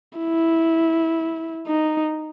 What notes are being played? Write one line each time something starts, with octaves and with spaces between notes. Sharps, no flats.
E4
D#4